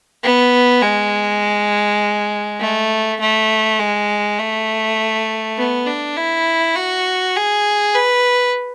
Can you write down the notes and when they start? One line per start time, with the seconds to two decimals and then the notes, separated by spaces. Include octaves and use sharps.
0.24 B3
0.82 G#3
2.60 A3
3.20 A3
3.79 G#3
4.39 A3
5.58 B3
5.87 D4
6.17 E4
6.76 F#4
7.36 G#4
7.95 B4